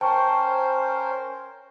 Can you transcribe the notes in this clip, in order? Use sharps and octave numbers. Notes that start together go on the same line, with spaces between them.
C#4 A#4 C5 G5 A5 C#6